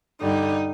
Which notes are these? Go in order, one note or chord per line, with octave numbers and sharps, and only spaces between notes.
G2 D3 G3 D#4